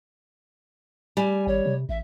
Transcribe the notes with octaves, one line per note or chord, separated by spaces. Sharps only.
G3 G#5
G#1 C#5
C3
A1 E5